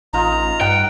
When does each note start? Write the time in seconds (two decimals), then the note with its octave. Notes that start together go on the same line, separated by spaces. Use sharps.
0.13 A1 D#4 F4 A#5
0.61 G2 F#5 G5